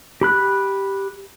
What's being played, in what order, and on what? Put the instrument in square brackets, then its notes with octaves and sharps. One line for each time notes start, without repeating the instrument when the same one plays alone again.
[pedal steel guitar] G4 B5 F#6